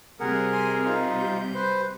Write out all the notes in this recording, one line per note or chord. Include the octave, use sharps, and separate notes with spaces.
C3 G3 G#4 A#4 F#5
G#5 C6
D#4 F4
G6
B4 C5